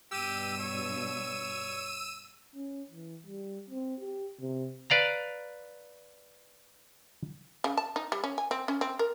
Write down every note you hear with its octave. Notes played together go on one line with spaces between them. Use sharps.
G2 B2 G4 E6 D#7
C#5
C#4
E3
G3
C4
G4
C3
B4 D5 F5 A#5
C#3
A5
D#4
G3
C#4
G#5
C4
C#4
C4
A#4